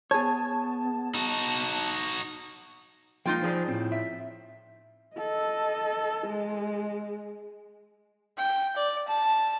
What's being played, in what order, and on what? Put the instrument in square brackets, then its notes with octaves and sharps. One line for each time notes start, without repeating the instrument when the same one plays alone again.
[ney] B3 [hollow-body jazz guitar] G#4 C#5 [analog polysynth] A5
[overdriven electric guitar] D#4 F#4
[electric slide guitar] F3 G#3 A#3 [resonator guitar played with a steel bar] D#4 F4 G5
[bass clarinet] F3 [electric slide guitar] D4 G#4 C5
[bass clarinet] A2 [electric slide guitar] C4
[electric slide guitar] E5
[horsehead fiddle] A4 D#5
G#3
[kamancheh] G5
D5
A5